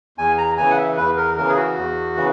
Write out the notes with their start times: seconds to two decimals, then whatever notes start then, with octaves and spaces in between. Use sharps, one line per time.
0.18 E2 G#5
0.38 A#5
0.58 C#3 E3 G#5
0.70 F#5
0.77 E5
0.97 E2 B4
1.17 A#4
1.36 C#3 E3 A#4
1.49 G#4
1.56 F#4
1.77 E2
2.16 C#3 E3